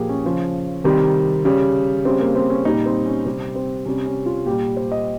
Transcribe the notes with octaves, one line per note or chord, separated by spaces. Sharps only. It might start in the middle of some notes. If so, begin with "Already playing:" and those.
Already playing: A#2 F3 G4 G#4 A#4
C#4
C#3 F3
C3 D#3 G3 C4
C#3 G3
C#3 G3 C4
A#3
C4
C#4
A#2 G3 D#4
C4
C#4
C3 G3 C4
C4
C3 G3 C#4
C#4
F4
A#2 G3 G4
C5
D#5